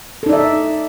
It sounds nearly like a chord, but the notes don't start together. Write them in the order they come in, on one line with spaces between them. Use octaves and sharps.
A4 D#4 D5 E5